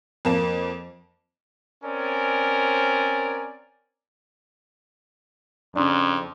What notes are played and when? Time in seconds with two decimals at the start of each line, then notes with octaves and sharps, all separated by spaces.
0.25 F2 A#3 A5
1.84 C4 C#4 A#4 D5 G#5
5.75 F2 C#3 D4